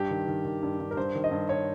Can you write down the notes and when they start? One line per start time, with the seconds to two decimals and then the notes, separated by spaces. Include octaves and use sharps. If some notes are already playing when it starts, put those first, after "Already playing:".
Already playing: G2 G4
0.10 D#3
0.27 D#3
0.45 D#3
0.62 G2
0.80 G2
0.91 A#4
0.97 G2 C5
1.15 D#3
1.24 D#5
1.31 G2
1.49 C#5